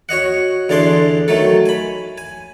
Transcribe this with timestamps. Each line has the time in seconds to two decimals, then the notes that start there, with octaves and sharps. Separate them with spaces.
0.09 F#4 C#5 D#5 F#5
0.69 E2 D3 D4 G#4 C6
1.28 D#3 F#3 A3 A4
1.66 G#5 B5
2.18 G#5